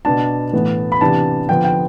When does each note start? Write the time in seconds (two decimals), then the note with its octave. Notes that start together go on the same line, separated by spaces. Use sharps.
0.05 B2 B3 D4 A5
0.53 A2 E3 B3
0.92 B5
1.01 C3 E3 B3 D4 A5
1.49 D3 F3 B3 G5
1.65 G5